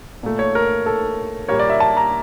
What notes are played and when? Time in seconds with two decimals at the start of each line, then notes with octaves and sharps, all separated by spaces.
0.23 A#2 A3
0.39 C#5
0.55 A#4
0.86 A4
1.48 A#2 G3 A#3 C#5
1.59 D5
1.70 E5
1.80 A5
1.97 A#5